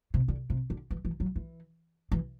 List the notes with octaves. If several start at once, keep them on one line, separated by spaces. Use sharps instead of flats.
C3
D3
C3
D3
E3
E3
F#3
E3
E3